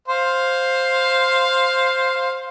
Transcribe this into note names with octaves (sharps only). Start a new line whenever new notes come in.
C5 F5